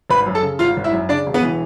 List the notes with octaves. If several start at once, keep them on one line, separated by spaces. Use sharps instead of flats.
G#1 B4 B5
F#2
A4 A5
C#3
G#1 F4 F5
G#1
E4 E5
F#2
C#3 D4 D5
E1
B3 B4
E3